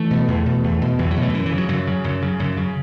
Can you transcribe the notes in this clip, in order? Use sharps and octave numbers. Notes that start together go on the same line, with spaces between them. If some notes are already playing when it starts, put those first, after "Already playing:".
Already playing: E3 A3
B2
E2
B2
E2
B2
E2 E3
F#3
B2
E3 A3
F#2 E3
E3
C#3
F#3
F#2 F#3
C#3
F#2
C#3
F#2
C#3